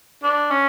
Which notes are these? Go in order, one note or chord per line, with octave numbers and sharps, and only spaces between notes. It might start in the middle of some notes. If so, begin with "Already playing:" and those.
D4
C#4